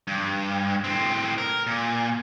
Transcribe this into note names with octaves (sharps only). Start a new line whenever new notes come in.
G2
A2 C4
A#4
A#2